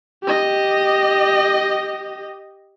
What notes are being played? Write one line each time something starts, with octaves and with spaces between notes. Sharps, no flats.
G4 D#5